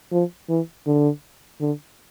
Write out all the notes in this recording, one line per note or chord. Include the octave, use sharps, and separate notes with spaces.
F3
E3
D3
D3